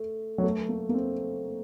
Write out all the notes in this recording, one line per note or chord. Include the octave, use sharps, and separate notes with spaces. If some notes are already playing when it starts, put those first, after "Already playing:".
Already playing: A3
F#3
A3
A#3
A#3
C4